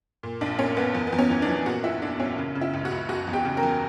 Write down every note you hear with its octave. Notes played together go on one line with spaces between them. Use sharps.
A#2
A#1 D4
A#2 C#4
A#1 B3
E2
B3
E2
C#4
E3
D4
E3
A#2 F#4
A#1 E4
A#2 D4
A#1 C#4
C#3
C#3
E4
C#2
F#4
C#2
F#1 F#4
E2
G4
C#3
A#4
E2